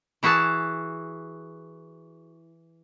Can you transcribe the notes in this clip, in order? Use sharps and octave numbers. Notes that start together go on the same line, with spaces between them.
E3 E4 F#4 G#4 A5